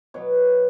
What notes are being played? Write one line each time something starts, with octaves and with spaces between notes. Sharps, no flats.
B2 F#3 B3 C#5